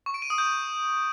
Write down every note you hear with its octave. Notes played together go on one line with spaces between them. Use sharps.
C#6
D7
D#7
D#6
G6